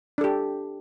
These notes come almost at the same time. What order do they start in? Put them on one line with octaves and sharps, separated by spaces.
D4 A4 G4